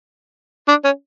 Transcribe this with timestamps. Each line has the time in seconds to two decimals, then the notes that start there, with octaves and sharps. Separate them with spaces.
0.68 D4
0.85 C#4